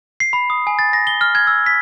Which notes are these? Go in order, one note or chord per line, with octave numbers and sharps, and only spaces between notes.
C7
B5
D#6
G#5
A6
A#6
G7
F6
G#6
E6
B6